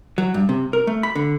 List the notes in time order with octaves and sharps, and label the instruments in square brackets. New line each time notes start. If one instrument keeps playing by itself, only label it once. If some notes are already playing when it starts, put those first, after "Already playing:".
[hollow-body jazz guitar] F#3
G2
C3
A#4
A3
B5
D3